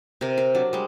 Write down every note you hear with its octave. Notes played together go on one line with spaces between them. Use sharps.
C3 A#4
A#4
F#3 D4
G3 G#3